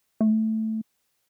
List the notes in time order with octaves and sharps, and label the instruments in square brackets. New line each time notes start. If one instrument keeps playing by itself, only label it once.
[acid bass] A3